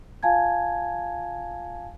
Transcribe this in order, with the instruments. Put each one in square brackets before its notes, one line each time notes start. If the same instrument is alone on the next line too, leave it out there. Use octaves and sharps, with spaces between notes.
[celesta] F4 F5 G#5 A5 G#6